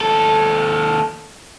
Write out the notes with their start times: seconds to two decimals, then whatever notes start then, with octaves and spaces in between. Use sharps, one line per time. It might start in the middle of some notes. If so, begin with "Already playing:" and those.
0.01 D#2 A4